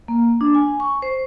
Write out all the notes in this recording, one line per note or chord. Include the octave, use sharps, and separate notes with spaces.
A#3
D4
G#5
C#6
C5